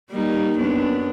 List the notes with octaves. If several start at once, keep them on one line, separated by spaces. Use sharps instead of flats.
G3 A#3 D#4
F#2 B3 D4